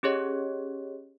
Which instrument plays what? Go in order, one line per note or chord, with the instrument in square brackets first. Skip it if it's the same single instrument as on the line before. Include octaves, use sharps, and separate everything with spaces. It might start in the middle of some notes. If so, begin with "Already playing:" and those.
[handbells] C#4 G4 G#4 C#5 D#5